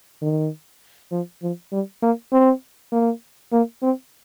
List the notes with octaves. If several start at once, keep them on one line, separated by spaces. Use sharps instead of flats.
D#3
F3
F3
G3
A#3
C4
A#3
A#3
C4